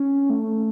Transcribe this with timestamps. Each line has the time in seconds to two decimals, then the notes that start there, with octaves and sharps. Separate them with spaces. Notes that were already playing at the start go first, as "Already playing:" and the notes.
Already playing: C#4
0.30 A3